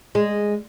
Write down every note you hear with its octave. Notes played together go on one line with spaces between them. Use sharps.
G#3